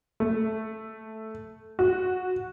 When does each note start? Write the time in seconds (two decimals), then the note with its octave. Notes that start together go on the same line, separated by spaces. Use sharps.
0.20 A3
1.79 F#4